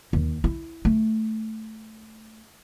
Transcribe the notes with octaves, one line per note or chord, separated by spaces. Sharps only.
D#2
E4
A3